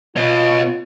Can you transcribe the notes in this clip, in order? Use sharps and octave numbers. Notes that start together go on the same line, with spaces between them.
B2 F4 C#5 D#5